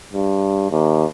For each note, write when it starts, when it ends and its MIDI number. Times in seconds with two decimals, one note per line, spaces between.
0.14 0.66 43
0.71 1.05 39